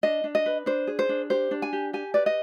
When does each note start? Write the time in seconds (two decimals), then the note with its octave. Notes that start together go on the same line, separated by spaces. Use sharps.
0.03 D4 D#5
0.24 D4
0.35 D#5
0.46 B4
0.66 D4 C5
0.87 G#4
0.99 C5
1.09 D4
1.30 G4 C5
1.51 D4
1.62 G#5
1.73 G4
1.93 G4 G#5
2.14 B4 D5
2.26 D#5